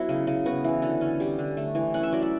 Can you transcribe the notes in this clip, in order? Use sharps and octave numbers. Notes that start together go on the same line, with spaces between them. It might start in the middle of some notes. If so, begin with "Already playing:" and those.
Already playing: F#3 B3 E4 F#4
C#3
C#3
B3 F#4
E3
D3 A4
C#4
G3 G4
D3
A3
E3
C#4 F#5
E5
F#3 D5
E5